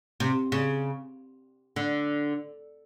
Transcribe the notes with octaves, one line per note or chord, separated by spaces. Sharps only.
C3
C#3
D3